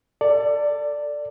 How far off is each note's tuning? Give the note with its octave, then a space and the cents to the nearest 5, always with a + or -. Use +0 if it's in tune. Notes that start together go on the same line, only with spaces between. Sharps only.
A4 +30 D5 +0